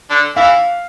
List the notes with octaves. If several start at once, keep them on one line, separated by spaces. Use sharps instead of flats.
D3 D4
E3 E4 F5